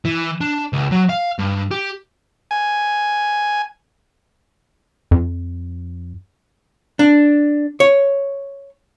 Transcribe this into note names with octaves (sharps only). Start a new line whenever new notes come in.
E3
D4
C#2
F#3
F5
G2
G4
G#5
F2
D4
C#5